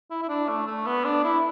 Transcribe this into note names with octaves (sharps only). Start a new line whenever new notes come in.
E4
E4
D4
A3
A3
B3
D4
E4